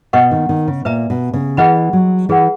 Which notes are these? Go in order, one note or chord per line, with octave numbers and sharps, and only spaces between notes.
B2 B4 D#5 F#5 C#6
D#3
D#3
C#3
A#2 B4 E5 A#5
B2
C#3
E3 G#4 B4 D#5 F#5 B5
F#3
E3 G#4 B4 F#5